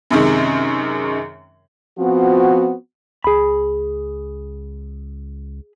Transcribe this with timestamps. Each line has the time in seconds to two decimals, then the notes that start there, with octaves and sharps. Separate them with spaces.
0.10 F#2 C3 D#3 G#3
1.99 F3 B3 C4 F4 F#4
3.24 C#2 G#4 B5